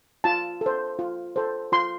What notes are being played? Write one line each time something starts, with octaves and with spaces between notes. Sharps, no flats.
F4 A5
A4 C5
F4
A4 C5
F4 C6